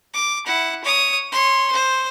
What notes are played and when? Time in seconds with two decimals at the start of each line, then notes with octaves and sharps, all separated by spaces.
0.14 D6
0.46 E4 F#5
0.84 C#5 D#6
1.32 C#5 C6
1.72 C5